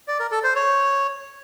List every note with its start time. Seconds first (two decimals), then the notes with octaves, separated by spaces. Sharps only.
0.08 D5
0.20 A#4
0.32 A4
0.44 C5
0.55 C#5